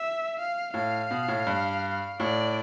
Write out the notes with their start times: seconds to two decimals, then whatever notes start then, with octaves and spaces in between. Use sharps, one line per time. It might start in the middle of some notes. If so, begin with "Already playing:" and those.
Already playing: E5
0.39 F5
0.74 A2 F5
1.11 B2
1.28 A2
1.47 G2
2.20 A2 D5